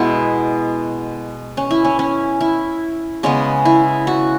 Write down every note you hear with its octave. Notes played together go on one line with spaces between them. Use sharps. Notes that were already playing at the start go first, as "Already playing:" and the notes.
Already playing: B2 G#3 B3 E4
C#4
E4
C#4
C#4
E4
C#3 G#3 B3 C#4
E4
F#4